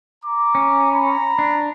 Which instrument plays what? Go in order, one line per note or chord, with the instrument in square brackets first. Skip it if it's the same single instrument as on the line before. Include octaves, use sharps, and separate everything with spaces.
[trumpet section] A#5 D6
[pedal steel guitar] C#4
[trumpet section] A#5 B5
[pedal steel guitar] D4